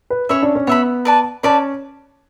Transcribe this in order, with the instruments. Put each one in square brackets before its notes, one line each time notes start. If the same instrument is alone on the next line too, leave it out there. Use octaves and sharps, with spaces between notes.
[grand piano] B4
[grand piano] C#4 [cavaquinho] C#5 E5 B5
[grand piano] D4
C#4
[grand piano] B3 [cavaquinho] C#5 E5 B5
[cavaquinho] B4 D5 A5
[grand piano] C#4 [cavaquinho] B4 D5 A5